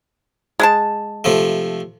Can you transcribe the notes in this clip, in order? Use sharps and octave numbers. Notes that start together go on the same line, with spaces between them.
G#3 G#4 A5
C3 F3 A3